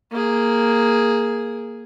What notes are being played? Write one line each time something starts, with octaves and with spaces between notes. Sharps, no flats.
A#3 G#4